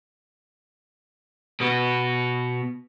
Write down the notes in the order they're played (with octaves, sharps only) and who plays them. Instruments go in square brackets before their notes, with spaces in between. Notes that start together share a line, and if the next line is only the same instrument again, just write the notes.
[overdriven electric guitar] B2 B3